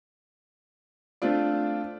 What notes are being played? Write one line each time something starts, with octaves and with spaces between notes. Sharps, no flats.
A3 C4 D4 F4 D5